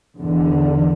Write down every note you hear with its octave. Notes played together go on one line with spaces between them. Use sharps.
E2 D3